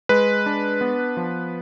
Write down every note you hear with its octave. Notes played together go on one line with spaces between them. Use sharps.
G#3 B4
D4
B3
F3